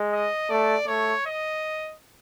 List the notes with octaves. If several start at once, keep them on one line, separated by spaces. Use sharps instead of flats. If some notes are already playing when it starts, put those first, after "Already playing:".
Already playing: G#3
D#5
A3 D5
A3 C#5
D#5